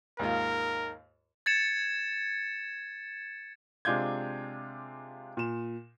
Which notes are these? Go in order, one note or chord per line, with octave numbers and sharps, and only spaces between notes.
D#2 G#2 F4 A#4
G#6 A6 C#7 E7
C3 G#3 D4 F4 G6 G#6
A#2 E7